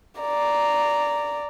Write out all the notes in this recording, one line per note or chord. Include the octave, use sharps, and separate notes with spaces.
D5 A#5